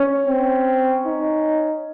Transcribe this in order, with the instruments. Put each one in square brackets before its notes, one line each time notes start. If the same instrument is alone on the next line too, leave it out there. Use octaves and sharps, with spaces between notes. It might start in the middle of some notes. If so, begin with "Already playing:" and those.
Already playing: [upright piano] C#4
[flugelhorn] C4
D#4